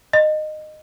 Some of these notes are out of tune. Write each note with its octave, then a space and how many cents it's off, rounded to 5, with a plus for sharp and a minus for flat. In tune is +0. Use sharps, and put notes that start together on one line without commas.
D#5 -20